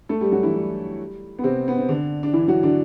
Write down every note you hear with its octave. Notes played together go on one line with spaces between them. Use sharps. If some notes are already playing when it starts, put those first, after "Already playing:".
A3 A4
G3 G4
F#3 F#4
E3 E4
G3
B3
C3 C4
B3
C4
D3 D4
D4
E3 E4
F#3 F#4
D3 D4